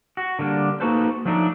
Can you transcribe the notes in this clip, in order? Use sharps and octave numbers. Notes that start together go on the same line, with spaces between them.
F#4
D3 G3 A#3 D4
A#3 D#4 F#4 A4 B4 C5
F3 F#3 A3 D4 D#4